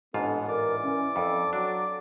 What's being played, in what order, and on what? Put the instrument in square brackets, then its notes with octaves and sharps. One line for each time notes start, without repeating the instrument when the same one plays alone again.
[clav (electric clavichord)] A1 G#2 F4 [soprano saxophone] B3 [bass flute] D4 [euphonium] A4
[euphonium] E3 [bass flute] A#4 [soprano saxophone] D5
[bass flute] C#4
[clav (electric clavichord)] F2 [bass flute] A4
[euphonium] F#3 [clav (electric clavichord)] D4 [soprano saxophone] D5